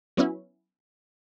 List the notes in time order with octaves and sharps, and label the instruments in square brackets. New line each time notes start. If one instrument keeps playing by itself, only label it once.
[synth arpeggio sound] F#3 B3 C#4 E4